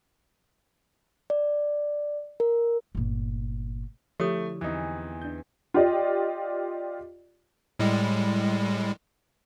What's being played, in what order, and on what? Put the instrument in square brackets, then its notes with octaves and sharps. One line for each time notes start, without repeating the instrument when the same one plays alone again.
[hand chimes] D5
A#4
[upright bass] G1 A#2
[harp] D3 E4 [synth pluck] F3 [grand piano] A3 [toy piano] G4 C#5 D#6
[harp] E2 C4 [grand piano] E3 D#4
[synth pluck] D4 G6
[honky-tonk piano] F4 G4 D5 D#5
[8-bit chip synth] A2 G3 G#3